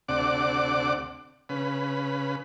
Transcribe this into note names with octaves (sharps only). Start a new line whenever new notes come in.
D2 C3 D5 F#5 D6
C#3 B4